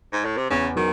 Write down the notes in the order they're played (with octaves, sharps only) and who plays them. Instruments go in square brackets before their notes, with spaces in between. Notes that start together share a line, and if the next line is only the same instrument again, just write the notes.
[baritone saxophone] G#2
A2
C3
[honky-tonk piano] E2 [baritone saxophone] C#3
[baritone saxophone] D#3 [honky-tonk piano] F#3